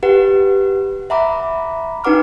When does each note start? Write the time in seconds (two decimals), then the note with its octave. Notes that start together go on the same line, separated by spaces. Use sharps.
0.03 G4 B4 F#5
1.10 E5 F#5 A#5 B5 D6
2.04 D4 D#4 B4 F#5 D6 F6